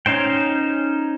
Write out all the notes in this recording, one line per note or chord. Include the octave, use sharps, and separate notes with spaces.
C#4 D#4 C5 G5